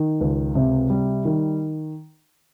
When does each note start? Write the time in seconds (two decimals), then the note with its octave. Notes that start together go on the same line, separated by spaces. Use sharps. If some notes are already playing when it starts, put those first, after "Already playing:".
Already playing: D#3
0.21 C#2
0.55 C3
0.90 G3
1.25 D#3